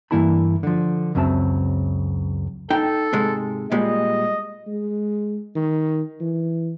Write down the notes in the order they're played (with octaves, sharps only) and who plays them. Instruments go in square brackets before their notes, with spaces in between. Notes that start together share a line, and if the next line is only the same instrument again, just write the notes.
[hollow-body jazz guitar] G2 E3 A#3 E4 A5 B5
D3 F3
C#2 F#2 C#3 C4 E5 A5
[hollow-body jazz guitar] D#4 G5 [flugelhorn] A4
[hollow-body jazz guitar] G#2 C3 G#3
[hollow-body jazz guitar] A#2 G3 G#3 [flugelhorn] D#5
[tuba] G#3
D#3
E3